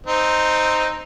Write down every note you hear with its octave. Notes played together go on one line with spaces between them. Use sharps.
C4 D#4